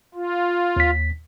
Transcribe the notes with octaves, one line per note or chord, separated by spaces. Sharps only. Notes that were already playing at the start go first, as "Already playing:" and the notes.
F4
D#2 B6